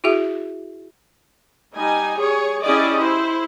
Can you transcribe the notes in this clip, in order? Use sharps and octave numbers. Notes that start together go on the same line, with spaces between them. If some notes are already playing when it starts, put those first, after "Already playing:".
E4 F#4 G#4 E5
G3 D#4 G#5
G#4 C#5
C#4 E4 G4 G#4 D5 D#5
E4 C5